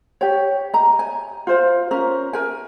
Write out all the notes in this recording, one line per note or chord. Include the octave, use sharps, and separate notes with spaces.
G4 C#5
D#5 A#5
G#5
F4 C5 F5
C#4 A#4
A#4 G#5